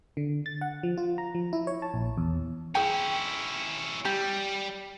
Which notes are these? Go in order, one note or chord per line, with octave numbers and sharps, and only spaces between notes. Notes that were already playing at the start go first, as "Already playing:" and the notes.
D3
A6
F#5
F3
F4
A#5
F3
E4
C#5
A5
A#1
E2
C#4 E4 G#4 G5
G3 G4